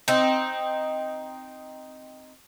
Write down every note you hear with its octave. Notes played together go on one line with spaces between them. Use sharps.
C4 D#4